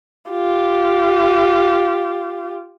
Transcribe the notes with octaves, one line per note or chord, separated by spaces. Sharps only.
F4 G4